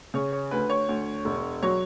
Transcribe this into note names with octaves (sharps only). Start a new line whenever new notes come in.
C#3 C#5
C#5
D2 B4
C#5
D2
E1
F#3 C#5